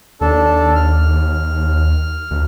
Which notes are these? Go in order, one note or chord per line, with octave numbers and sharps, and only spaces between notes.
D#2 D4 A4
F6
D2